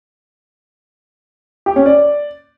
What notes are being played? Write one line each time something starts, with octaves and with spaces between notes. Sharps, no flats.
G4
C#4
D5